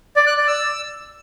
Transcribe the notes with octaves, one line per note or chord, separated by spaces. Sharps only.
D5
F#6
D5
E6